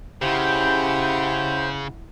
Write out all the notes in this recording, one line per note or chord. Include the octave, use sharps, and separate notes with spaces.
C#3 E4 G4 C5 F#5 G6